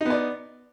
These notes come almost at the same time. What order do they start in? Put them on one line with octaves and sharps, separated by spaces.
D#4 B3 D5